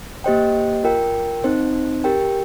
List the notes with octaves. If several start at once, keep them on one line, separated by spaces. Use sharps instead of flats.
A#3 G4 C5 D#5 G5
F4 A#4 G5
C4 D#4 C5
G4 A#4 G5